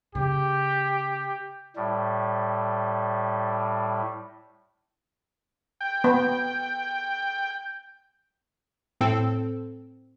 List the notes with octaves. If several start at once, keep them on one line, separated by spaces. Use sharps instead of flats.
C#3 G4
A2 G3
G5
B3
A2 C4 A4